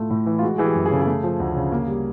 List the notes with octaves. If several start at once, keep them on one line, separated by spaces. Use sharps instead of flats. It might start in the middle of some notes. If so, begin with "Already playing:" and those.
Already playing: A2 A3 F4
A2
E3
F4
G#3 F#4
E3 G#4
G4
F#2
G#4
C#3 A4
G#4
A3
F3
D2
C#3
A#3
G3